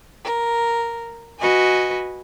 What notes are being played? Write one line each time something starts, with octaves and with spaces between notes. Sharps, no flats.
A#4
F#4 B4 D#5 G#5